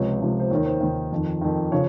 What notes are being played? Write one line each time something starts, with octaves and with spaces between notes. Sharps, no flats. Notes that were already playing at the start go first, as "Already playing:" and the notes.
Already playing: C#2 C3 F3 C#5
C#2 C3 F3
C5
D#2 D#3 C#5
C5
D#2 D#3
F2 D#3
F2 D#3
C#3 F3 C#5